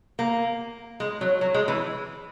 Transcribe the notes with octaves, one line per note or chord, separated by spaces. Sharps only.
A#3
G#3
F#3
F#3
G#3
E3